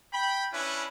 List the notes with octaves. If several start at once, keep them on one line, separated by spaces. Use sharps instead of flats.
G5 B5
C#4 D4 E4 B4